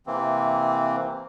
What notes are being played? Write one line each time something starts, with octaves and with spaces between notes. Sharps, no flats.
C3 E3 A#3 C4